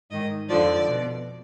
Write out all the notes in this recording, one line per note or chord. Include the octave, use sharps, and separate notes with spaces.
G#2 D#3 D#5
F2 D3 F3 D5
B2